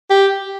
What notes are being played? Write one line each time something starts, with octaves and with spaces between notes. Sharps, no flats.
G4